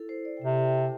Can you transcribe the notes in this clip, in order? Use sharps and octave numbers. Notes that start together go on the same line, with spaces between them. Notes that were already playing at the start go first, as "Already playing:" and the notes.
Already playing: E4 A4
C5
D5
G5
C3 E5
G5
A5